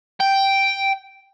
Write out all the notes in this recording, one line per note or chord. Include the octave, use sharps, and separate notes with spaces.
G5